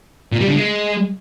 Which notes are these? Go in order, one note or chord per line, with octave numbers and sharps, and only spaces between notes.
A#2
G3
D3
G#3